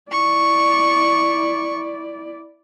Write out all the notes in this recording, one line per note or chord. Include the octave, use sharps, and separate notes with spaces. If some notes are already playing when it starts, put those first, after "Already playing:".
E4 D5 C#6